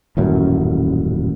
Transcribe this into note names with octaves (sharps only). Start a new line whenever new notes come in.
D#1 A1 F#2